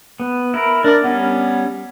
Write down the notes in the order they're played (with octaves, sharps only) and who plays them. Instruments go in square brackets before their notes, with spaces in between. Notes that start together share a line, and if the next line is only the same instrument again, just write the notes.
[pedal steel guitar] B3
E4 A#4
[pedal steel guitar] D4 D5 [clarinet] A#4
[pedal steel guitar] G3 C#4 [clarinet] B3